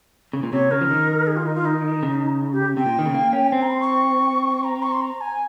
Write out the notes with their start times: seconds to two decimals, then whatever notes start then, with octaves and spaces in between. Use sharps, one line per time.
0.33 C#3
0.43 A#2
0.52 C3 C#5
0.71 C#3 A#4
0.81 F3
0.90 D#3
1.27 G#4
1.36 F4
1.46 D#4
1.55 F4
1.65 D#4
2.03 C#3
2.52 G4
2.77 C3 G5
2.86 A#2
2.99 D#3
3.06 C#3
3.14 A#3
3.33 C#4
3.47 G#5
3.52 C4 G5
3.62 A#5
3.71 C6
3.80 C#6
4.64 A#5
4.83 C#6
4.92 C6
5.01 A#5
5.21 G#5